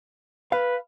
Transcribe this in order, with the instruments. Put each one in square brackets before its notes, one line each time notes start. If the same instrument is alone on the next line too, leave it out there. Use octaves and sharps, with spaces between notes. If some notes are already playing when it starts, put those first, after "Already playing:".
[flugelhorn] B4 [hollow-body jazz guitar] F5